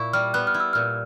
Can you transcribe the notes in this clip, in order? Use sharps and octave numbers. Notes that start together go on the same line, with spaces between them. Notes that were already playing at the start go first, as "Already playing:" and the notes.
Already playing: A#2 E4 C#6
G3 F6
B3 F#6
F6
E4
E6
A#2 F6